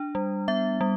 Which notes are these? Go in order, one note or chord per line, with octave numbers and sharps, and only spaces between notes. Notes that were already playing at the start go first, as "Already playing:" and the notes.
Already playing: D4
G3
B3 E5
G3